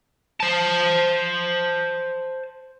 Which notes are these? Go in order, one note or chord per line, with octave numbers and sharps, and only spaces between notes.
C5 A5